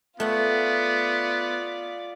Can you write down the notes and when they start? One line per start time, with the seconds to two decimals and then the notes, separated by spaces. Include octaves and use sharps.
0.20 A3 B3 F4 D5 F#5